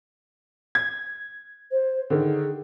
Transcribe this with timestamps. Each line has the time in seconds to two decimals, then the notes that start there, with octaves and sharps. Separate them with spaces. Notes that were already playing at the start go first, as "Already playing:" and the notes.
0.75 G#6
1.71 C5
2.10 D3 D#3 G#4